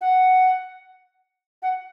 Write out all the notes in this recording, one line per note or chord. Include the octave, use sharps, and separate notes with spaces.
F#5
F#5